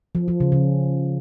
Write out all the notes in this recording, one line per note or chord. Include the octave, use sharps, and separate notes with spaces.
F3
F3
C#3
C#3